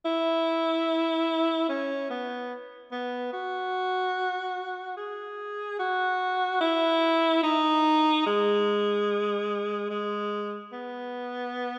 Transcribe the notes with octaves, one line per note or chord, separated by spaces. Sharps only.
E4
C#4
B3
B3
F#4
G#4
F#4
E4
D#4
G#3
G#3
B3